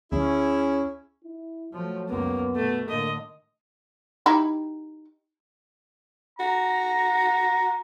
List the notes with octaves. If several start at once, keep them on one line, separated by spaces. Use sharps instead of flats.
D2 C#4 E4 G#4
E4
F3 F#3 A3
C#2 F#2 A#3 B3
B2 A3
A2 D3 A#3 D#5
D#4 E4 G4
F#4 A#5